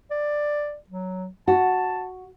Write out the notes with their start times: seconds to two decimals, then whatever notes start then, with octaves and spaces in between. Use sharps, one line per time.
0.11 D5
0.89 F#3
1.48 F#4 A5